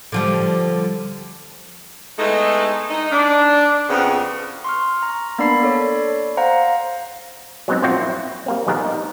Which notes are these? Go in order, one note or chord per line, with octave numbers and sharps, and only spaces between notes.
D3 F3 G3
G#3 A3 B3 D#4 E4 A4
D#4
D4
F2 C#3 F3 B3 F4 F#4
C6 C#6 F6
A#5
A#3 B3 D4 D5 B5 C7
A4 C#5 D5
C5 F5 F#5 A#5
F#3 G#3 B3 C4 D#4
A#1 F#2 C4 F4 F#4 G5
E4
G3 A#3 C4
A#1 D#3 G3 B3 G#4 A#4
D#4